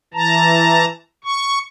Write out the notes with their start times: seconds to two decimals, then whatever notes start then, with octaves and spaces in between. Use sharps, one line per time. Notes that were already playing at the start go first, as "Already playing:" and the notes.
0.14 E3 A5 A#5
1.24 C#6